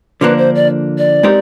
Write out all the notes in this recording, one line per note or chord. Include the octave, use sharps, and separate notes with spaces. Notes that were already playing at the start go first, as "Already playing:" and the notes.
D3 F3 A#3 D4 B4
C5
D5
D5
G#3 C4 D#4 G4 A#4